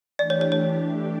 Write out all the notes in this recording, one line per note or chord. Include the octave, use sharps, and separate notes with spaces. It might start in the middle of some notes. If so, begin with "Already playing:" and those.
E3 A3 D4 G4 D5
C#5
C#5
C#5